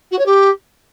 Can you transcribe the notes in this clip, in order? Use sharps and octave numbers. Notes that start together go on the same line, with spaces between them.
F#4
C#5
G4